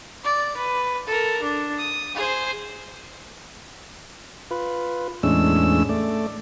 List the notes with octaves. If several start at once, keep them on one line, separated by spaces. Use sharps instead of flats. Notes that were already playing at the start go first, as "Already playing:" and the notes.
D5
B4
A4 A#4
D4
D#6
G#4 C5
F4 B4
E2 A2 G#3 C#4 D4 E6
A3 D5